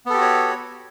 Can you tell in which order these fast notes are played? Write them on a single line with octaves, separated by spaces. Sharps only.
B3 A4 G4 F#4 C#5